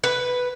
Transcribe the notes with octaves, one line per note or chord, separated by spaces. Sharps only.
B4